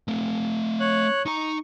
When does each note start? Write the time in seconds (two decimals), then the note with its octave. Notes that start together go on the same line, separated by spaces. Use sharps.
0.08 A3 C4
0.80 C#5 F#6
1.26 D#4 A#5 C#6